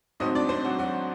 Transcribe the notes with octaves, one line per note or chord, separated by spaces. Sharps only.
G#2 D#3 F#3 A3 C4 D#4 D#5
D4 D5
C4 C5
F#3 F#4
F#3 F#4